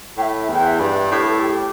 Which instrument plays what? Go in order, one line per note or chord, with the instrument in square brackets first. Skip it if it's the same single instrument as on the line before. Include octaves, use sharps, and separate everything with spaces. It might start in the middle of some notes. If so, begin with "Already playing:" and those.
[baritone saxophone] A2 [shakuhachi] E5 G5
[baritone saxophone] E2 [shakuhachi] G5
[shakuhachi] E5
[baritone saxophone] G2
[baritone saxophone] A2 [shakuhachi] G4
[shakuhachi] A4
G4